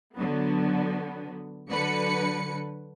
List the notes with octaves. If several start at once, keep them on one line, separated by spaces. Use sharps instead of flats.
D3 F#3 B3
D3 F#3 B4 C#7